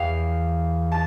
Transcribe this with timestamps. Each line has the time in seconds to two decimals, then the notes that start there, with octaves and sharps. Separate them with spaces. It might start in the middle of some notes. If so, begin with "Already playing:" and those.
Already playing: E2 E3 F5 G5
0.92 A5